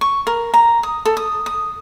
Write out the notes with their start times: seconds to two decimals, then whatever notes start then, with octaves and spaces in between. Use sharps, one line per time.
0.01 C#6
0.27 A#4
0.54 A#5
0.83 D#6
1.05 A4
1.17 D#6
1.46 D#6